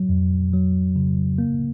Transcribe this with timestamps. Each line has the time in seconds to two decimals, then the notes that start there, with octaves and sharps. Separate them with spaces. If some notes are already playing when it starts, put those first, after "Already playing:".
Already playing: F#3
0.09 F2
0.53 F#3
0.96 C#3
1.38 A#3